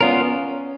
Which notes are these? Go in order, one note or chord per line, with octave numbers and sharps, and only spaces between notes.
B3 C#4 F4 A#4